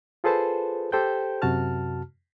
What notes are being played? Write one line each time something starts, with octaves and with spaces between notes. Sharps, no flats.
F4 G#4 A4 B4 C5 A5
G4 A4 C5 G5 G6
F#2 C3 F#4 A5 F6